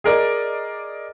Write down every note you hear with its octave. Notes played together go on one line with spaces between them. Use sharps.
G#4 A#4 D5 D#5